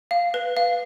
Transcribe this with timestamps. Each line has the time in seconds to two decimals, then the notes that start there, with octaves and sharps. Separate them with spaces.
0.11 F5
0.34 B4
0.57 F5